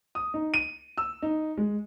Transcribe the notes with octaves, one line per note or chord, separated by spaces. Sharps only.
D#6
D#4
D#7
E6
D#4
G#3